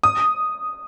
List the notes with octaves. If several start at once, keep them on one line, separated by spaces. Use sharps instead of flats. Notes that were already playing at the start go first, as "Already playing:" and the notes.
D#6